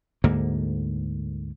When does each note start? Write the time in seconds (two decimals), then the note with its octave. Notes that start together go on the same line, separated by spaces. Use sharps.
0.24 D2 G#2 D3 A#3